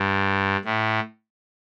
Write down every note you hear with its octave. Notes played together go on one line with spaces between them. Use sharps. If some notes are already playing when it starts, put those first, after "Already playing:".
Already playing: G2
A2